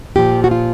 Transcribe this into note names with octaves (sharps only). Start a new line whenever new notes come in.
A#2 F3 G4
F#4
F4